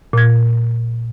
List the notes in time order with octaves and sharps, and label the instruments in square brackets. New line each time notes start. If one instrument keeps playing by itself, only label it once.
[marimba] A#2 G#6